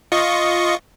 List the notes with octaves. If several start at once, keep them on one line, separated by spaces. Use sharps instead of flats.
F4 D#5 C#6